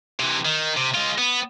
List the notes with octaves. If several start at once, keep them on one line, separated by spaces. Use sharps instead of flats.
C3 E3
D#3
C3
G#3 F4
B3